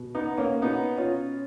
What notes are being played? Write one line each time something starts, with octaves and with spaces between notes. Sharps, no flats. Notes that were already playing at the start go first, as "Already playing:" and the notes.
Already playing: B2
B3 D#4
A#3 C#4
B2 B3 D#4
C#4 F4